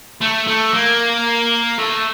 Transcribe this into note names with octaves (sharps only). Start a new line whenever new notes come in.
A3
A3
A#3
A3